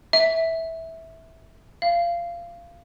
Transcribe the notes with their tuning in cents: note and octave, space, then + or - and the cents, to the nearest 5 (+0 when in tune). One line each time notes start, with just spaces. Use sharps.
E5 -15
F5 -20